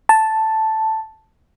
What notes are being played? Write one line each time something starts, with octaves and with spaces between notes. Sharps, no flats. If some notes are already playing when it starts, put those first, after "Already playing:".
A5